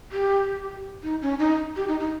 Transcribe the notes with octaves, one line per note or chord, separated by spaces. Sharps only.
G4
D#4
C#4
D#4
G4
D#4
D#4